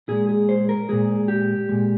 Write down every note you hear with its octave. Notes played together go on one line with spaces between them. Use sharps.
A#2 G#3 G#4
G#4
C5
A#4
A#2 G#3 G#4
G4
A#2 G#3